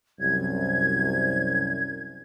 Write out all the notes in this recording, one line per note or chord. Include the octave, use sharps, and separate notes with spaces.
C2 F#2 G#6